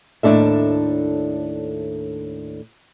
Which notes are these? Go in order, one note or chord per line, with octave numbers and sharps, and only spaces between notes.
D#2 A2 D4 A4 E5